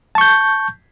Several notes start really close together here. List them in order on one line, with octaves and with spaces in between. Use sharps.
A5 C#6 G6